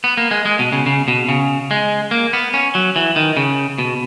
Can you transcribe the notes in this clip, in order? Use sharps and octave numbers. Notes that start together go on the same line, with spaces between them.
B3
A#3
G#3
G#3
B2
C#3
C#3
B2
C#3
G#3
A#3
B3
C#4
F#3
E3
D#3
C#3
B2